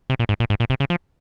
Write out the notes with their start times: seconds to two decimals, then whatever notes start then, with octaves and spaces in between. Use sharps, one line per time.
0.10 C3
0.20 A#2
0.29 G#2
0.40 A#2
0.50 G#2
0.60 A#2
0.70 C3
0.80 C#3
0.90 F3